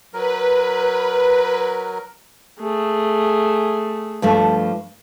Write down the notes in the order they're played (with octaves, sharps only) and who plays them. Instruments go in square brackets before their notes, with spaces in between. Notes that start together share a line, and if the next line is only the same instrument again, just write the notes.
[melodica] F#3 A#4 [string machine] B4
[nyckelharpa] A3 G#4
[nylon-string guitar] G2 F3 A3